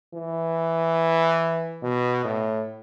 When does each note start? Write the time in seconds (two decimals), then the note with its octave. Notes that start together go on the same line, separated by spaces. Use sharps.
0.14 E3
1.83 B2
2.24 A2